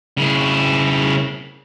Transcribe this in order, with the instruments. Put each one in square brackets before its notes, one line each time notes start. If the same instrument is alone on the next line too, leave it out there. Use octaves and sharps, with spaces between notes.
[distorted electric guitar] C#3 E4